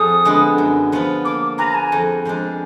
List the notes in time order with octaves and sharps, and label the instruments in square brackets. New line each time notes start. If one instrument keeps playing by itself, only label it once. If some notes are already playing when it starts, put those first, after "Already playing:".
Already playing: [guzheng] F2 F4 G#4 D5 [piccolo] D#6
[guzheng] D3 G#3 B3
F#2
F3 B3 F4 B4
[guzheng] A#3 [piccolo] D6
[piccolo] D6
[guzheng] F4 G#4 B4 [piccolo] A#5
[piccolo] A#5
G#5
[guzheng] F2
F3 G#3 D4